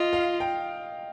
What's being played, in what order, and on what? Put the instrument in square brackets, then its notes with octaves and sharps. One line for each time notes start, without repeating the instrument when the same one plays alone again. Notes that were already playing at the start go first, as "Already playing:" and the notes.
Already playing: [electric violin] F4 [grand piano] D#5
[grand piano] F5
G5